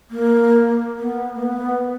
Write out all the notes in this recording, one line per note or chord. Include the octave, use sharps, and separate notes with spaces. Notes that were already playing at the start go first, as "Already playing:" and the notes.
A#3
B3
A#3
B3